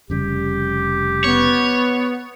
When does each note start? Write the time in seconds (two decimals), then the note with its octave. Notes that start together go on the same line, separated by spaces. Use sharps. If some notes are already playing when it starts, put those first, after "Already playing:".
0.10 F1 C#3 G3 G4
1.24 B3 C#5